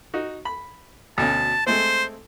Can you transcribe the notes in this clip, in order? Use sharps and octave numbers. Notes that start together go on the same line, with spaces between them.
D#4 F#4
B5
D2 B2 C#4 A5
G#3 A3 C4 C5